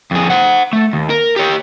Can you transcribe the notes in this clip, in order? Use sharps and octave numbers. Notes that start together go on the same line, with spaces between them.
F2 G#4
C5 F#5
A3
D#2
A#4
G4 C#5